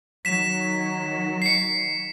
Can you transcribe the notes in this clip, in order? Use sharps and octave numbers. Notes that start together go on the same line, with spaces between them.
D#3 F#3 B6 E7
C7 C#7